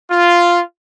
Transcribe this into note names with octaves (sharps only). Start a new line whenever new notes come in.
F4